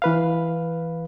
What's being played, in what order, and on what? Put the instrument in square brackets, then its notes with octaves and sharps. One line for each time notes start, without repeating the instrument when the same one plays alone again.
[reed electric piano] E3 B4 F5